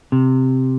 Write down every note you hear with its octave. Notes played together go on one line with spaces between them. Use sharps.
C3